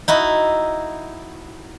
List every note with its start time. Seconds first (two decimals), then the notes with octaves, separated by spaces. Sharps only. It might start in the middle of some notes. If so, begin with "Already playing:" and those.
0.08 D#4 E4 F#4